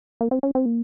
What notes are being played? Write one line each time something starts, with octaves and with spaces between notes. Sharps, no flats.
A#3
C4
C#4
C4
A#3